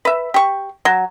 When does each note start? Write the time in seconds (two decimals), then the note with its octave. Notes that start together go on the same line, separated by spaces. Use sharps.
0.05 B4 E5
0.34 G4 C#6
0.85 F#3